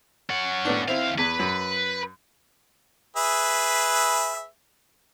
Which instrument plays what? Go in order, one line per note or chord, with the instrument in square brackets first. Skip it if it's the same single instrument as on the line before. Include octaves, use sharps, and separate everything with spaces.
[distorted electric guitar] C#4 F#5
[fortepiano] A2 B3 D4
[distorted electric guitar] D#2 F5 [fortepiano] C4 E4
[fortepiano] E2 [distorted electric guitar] B4
[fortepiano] F#2
[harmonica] G#4 B4 E5